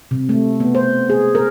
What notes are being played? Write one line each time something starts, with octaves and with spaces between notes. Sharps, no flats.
C3
A3
B3
C5
G#4
A#4